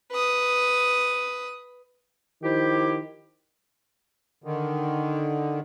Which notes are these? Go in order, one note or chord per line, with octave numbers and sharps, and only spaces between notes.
B4 D#6
D#3 F3 E4 G4
D3 D#3